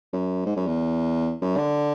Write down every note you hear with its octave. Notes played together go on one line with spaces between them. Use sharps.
F#2
G#2
F#2
E2
F#2
D3